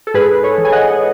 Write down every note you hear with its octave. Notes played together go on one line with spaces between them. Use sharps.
A4
G#2 G#4 B4
A4 C#5
E3
G#5
D#5 F#5